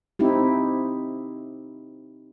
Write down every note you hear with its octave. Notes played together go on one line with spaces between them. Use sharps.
C4 D#4 E4 G4